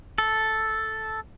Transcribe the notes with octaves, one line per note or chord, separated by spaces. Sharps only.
A4